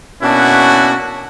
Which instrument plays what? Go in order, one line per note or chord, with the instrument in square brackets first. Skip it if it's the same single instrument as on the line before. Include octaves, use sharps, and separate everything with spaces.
[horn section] B2 A#3 C#4 D4 E4 F#4